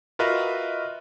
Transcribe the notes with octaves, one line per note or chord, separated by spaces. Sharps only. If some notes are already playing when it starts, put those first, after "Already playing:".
F4 F#4 A#4 B4 D#5 E5